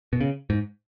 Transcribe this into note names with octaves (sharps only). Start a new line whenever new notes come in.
B2
C#3
G#2